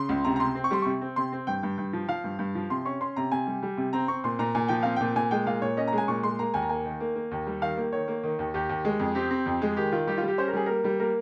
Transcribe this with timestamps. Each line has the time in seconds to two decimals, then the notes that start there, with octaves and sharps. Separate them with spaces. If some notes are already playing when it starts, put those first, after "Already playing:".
Already playing: C#3 C6
0.09 C#2
0.24 C3 A#5
0.36 A#5
0.39 C3 C6
0.55 C4
0.64 C#6
0.71 G3 C6
0.82 C3 C#6
1.01 C4
1.16 C3 C6
1.32 C4
1.47 G2 G5
1.63 G2
1.78 G2
1.93 F3
2.09 F3 F5
2.24 G2
2.39 G2
2.55 F3
2.70 C3 C6
2.85 C#4 C#6
3.01 C#4 C6
3.16 C3 A#5
3.32 C3 G#5
3.47 G3
3.63 G3
3.77 C3
3.93 C4 A#5
4.08 C4 C#6
4.24 A#2 C6
4.39 A#2 A#5
4.55 A#2 G#5
4.68 F3 G5
4.83 C4 F5
4.96 A#2 G5
5.16 A#2 G#5
5.31 G#3 G5
5.46 A#2 F5
5.62 A#2 C#5
5.77 C#4 D#5
5.88 A#5
5.93 G#3 G#5
6.08 A#2 C#6
6.23 G#3 C6
6.39 A#3 A#5
6.54 D#2 G#5
6.62 A#5
6.69 A#3 G#5
6.85 D#3
7.00 A#3
7.15 A#3
7.31 D#2
7.47 G3
7.61 D#3 F5
7.77 A#3
7.92 D#3 C#5
8.08 A#3
8.23 D#3
8.39 D#2
8.54 D#2 G4
8.69 D#2
8.85 G#3
9.00 F2
9.15 C4 G4
9.31 C4
9.46 F2
9.62 G#3
9.77 D#3 G4
9.92 D#3 F4
10.07 G3 G4
10.18 G3 F4
10.28 G4
10.38 C#4 C5
10.48 A#4
10.53 G3 G#4
10.66 A#3 A#4
10.84 G3
11.00 A#3 A#4